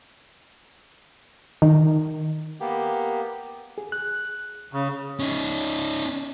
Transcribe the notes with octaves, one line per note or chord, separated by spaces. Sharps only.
D#3
A#3 B3 G4
G#4
F#6
C#3
C#4 D#4